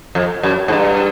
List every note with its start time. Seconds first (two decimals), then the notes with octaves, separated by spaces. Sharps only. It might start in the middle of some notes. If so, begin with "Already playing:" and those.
0.15 F2
0.43 F#2
0.68 G#2
0.73 G2